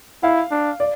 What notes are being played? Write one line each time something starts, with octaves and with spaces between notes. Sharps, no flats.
E4 F5
D4
D5